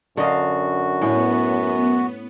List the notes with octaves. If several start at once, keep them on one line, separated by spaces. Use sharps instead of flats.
F#2 D3 F#4 D#5 F5
A2 B3 C#4